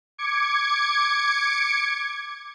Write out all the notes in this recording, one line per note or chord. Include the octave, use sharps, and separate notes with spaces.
D6 G#6 C#7